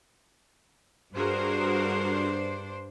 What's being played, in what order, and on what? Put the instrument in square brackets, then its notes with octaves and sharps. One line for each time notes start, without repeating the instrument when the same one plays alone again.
[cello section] G2 D4 C5 [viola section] F#4 G#4 A#4